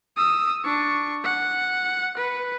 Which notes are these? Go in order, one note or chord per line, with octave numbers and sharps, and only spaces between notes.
D#6 E6
D4 C#6
F#5
B4